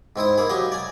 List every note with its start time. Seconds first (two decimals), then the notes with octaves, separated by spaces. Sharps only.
0.16 G#2 C4 E4 D#6
0.38 A#3 E4 G#4
0.50 F#3 G4 D#5 F5
0.72 D5 G#5